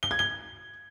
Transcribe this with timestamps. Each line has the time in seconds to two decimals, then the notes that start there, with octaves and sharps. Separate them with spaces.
0.03 G7
0.11 G#6
0.19 G7